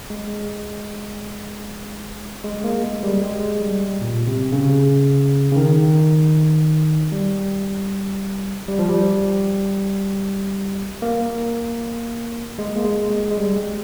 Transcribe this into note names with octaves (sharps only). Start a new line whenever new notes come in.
G#3
G#3
A#3
G#3
G3
G#3
G3
A#2
C3
C#3
C#3
D#3
G3
G3
F3
G3
A#3
G#3
A#3
G#3
G#3
G#3
G3
G#3